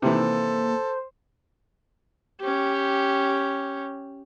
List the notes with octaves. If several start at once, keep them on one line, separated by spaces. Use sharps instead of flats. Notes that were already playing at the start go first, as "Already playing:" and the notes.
C3 D#3 E3 A#3 A4 C5
C#4 G4